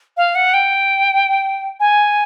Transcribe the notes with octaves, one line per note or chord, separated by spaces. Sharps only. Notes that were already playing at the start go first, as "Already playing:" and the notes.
F5
F#5
G5
G#5